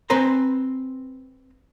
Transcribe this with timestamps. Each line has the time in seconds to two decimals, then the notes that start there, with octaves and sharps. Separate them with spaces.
0.10 C4 B4 C5 G#5 A#5